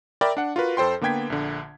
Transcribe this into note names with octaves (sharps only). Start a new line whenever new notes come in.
A#4 D5 E5 G5 B5
D4 F#5
F4 F#4 A#4 B4
F2 A4 C5 G5 C6
D3 A#3 B3 G5 G#6 B6
A#1 D3